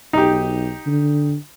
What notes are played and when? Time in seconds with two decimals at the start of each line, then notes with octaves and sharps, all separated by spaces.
0.13 B1 D#4 G4
0.86 D3